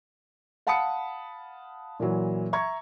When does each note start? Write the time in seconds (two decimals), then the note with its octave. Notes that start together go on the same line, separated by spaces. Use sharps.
0.67 F5 F#5 A5 B5 D#6 C#7
2.00 A#2 E3 F#3
2.53 E5 A#5 C#6 G#6